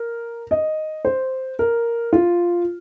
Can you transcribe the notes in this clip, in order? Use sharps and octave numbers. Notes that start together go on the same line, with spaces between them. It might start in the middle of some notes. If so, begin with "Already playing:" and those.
Already playing: A#4
D#5
C5
A#4
F4